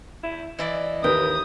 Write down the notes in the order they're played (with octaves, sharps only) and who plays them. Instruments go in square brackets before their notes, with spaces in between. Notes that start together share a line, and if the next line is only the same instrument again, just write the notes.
[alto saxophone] E4
[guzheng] E3 E4 D5 [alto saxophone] D#5
[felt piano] D#2 B4 [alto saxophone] A#4 [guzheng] G5 [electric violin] D#6